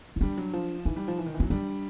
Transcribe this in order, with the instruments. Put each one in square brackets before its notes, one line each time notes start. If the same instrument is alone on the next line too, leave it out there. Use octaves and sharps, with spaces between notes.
[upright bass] D#4
[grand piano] G3 [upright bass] D4
[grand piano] F#3
F3
[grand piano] E3 [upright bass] D#4
[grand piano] G3
F3
E3
D#3
E3
[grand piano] F#3 [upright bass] C#4
[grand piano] G3 [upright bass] D4